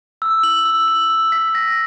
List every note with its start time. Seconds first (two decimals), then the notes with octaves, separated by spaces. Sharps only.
0.22 E6
0.43 F#7
0.65 E6
0.88 F#7
1.10 E6
1.32 B6
1.55 A#6